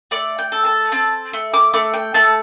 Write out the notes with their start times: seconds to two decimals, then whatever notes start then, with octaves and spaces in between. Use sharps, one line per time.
0.11 A3 D5
0.38 G5
0.52 A4
0.65 A5
0.92 C4 A5
1.33 A3
1.54 D6
1.74 A3 D6
1.94 G5
2.14 A3 A5